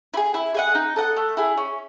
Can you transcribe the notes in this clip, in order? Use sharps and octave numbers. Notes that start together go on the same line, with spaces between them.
E4
G#4
E4
G#4 D#5 F#5
D#4
A4 D#5 F#5
A3
E4 G#4
C#4